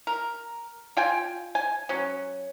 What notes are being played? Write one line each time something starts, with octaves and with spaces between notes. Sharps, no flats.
A#4
F4 G5 G#5
G#5
F#3 C#4